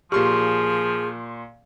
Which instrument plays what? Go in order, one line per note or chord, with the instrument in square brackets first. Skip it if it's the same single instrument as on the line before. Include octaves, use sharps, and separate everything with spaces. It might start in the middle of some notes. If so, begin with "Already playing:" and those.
[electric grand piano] A#2 C6 C#6 [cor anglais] F3 [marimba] G4 [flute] G#4